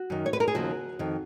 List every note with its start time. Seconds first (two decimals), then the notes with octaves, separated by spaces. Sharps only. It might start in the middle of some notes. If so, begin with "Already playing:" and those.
Already playing: F#4
0.10 F#2 D#3
0.26 C#5
0.33 B4
0.40 A#4
0.48 G#4
0.55 D#2 C#3 F3 F#4
0.99 F2 D#3